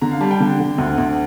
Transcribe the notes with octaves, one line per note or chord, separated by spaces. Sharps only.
D3 A#5
F5
G3 A5
G5
D3
D3
D2
D2